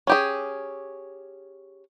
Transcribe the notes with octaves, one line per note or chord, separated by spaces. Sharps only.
C#4 G4 G#4